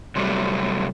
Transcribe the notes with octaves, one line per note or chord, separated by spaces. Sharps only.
C3 F#3 G3 A3